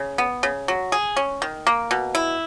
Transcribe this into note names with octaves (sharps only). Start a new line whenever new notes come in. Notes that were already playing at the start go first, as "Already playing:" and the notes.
Already playing: C#3
B3
C#3
F#3
G#4
C#4
D#3
A#3
B2
E4